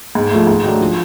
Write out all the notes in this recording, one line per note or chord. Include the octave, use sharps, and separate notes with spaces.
G#2
F3 A3
G#2
D#3 F#3 A3 D4
F3